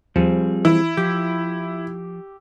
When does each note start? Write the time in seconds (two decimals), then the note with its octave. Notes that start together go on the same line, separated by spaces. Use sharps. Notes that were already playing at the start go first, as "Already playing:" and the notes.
0.16 D#2 F3 G3 C4 G#4 C#7 D#7
0.65 E3 E4 D7
0.97 F3 G4